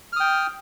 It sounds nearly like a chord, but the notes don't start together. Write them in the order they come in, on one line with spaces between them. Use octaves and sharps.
F6 D#6 G5